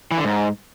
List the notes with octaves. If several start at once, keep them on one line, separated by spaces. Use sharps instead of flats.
E3
D3
G#2